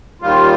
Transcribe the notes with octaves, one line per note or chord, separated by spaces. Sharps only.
D#2 D#3 G3 F4